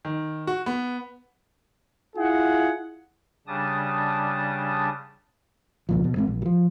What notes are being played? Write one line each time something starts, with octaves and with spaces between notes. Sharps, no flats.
D#3
F#4
B3
E4 F4 G#4 F#5
C#3 G3 D4 A5 D#6
C#2 A#2 F3
B2
A1 G#3 B3 C4
A#1
F3 F#3